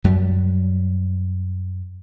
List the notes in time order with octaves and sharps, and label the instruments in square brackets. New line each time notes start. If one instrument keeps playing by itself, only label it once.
[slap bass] F#2 F#3 G3